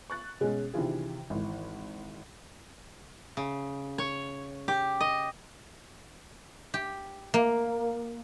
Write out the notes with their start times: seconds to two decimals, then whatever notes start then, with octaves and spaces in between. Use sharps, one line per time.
0.10 C#6 F#6 A6
0.41 B2 G#3 C#4
0.74 C3 D#3 E3 D4 F4 G#4
1.30 G#1 E3
3.37 C#3
3.98 C#5
4.68 G4
5.00 D#5
6.74 G4
7.34 A#3